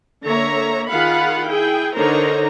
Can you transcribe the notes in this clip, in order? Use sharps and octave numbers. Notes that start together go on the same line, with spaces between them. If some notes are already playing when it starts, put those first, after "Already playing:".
D3 A#3 C#5 E5 A#5
D#3 F4 G#4 F5 F#5 B5
E4 G#4 G5
D3 D#4 A#4 C5 C#5 A#5